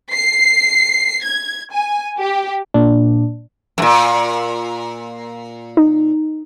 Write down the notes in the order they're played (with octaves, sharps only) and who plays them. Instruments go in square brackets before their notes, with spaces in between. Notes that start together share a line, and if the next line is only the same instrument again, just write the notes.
[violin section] C7
G#6
G#5
G4
[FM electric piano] A#2 D4
[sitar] F#2 A#2
[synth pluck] D#4